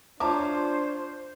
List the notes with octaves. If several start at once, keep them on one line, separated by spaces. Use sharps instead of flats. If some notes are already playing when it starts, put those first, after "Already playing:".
D4 F4 C5 C#5 E5 A5 A#5 D6